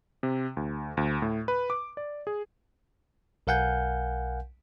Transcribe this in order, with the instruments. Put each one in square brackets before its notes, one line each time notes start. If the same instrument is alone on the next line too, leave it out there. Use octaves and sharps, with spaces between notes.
[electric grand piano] C3
D2
D2
A2
B4
D6
D5
G#4
[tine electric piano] B1 A#4 F5 F#5 G#5 G6